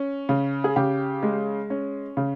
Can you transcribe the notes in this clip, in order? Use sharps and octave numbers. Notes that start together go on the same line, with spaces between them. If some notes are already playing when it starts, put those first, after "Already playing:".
Already playing: C#4
C#3
G#4
C#3 G4
G#3
C#4
C#3